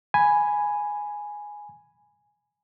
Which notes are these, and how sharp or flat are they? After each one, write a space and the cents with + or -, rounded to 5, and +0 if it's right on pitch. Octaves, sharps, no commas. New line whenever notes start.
G#5 +0 B5 +0